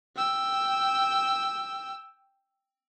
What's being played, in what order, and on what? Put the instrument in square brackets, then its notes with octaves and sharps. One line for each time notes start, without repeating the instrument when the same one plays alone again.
[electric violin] G5 E6